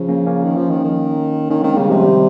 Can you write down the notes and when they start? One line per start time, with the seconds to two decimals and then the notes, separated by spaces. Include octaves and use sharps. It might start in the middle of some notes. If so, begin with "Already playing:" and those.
Already playing: C#3 F3
0.09 A#3 C#4
0.27 A#3 C#4
0.45 D#3
0.57 F3
0.70 D#3
0.84 D#3
1.50 D#3 A#3 C#4
1.63 D#3 G#3 C4
1.76 C#3 G3 A#3
1.89 C3 F3 G#3
2.03 D#3 G3